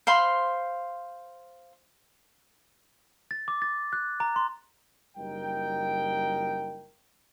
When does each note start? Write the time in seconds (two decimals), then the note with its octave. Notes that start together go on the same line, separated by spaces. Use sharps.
0.07 C5 F5 B5 C6
3.31 A6
3.48 D6
3.62 A6
3.93 F#6
4.20 A#5
4.36 C6
5.17 F#1 G3 D#4 A#4 G5